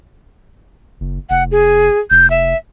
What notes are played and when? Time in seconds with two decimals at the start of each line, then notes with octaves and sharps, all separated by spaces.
1.00 F#1
1.30 F1 F#5
1.51 G#4
2.10 F1 G6
2.30 E5